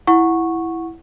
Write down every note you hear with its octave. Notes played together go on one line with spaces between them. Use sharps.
E4 F#5 C#6